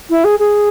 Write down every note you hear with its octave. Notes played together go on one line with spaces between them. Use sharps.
E4
G#4
G#4